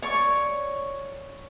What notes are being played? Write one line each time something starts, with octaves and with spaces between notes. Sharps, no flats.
C#5 D5 C#6